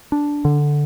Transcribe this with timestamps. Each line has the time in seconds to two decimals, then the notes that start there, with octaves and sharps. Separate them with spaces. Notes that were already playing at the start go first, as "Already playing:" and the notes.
0.12 D4
0.45 D3